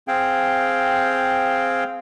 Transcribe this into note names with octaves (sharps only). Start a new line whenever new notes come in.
C4 G#4 F5 G5